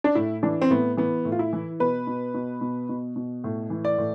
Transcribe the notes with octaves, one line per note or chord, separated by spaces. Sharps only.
D4
A2 E4
E3 D4
C4
A2 B3
E3 B3
A2
F4
E4
E3
B2 B4
B2
B2
B2
B2
B2
A2
E3
D5
A2